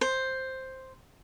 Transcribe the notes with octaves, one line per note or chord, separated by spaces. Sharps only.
C5